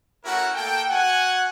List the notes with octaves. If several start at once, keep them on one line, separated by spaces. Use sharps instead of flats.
A3 C#4 E4 F#4 A#4 F#5
A3 A#3 A4 G5
F#4 F#5 G#5